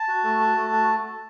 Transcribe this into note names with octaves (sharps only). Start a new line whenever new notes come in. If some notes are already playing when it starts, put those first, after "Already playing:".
Already playing: A5
F#4
A3
F#4
A3
F#4